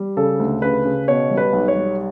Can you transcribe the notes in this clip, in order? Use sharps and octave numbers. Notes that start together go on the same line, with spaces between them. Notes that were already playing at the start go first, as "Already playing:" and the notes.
Already playing: G3
C#3 A4
D2
C#3 B4
C#3
B2 C#5
G3
B4
B1
C#5
G3